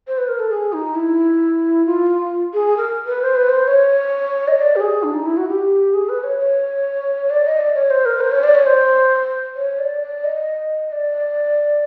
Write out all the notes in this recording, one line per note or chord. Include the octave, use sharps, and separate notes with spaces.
C5
B4
A#4
A4
G#4
D#4
E4
F4
G#4
A#4
B4
C5
B4
C5
C#5
D#5
D5
G4
G#4
D4
D#4
E4
F#4
G4
G#4
B4
C#5
C#5
D5
D#5
D5
C#5
C5
A#4
C5
C#5
D5
C#5
C5
C#5
D5
D5
D#5
D5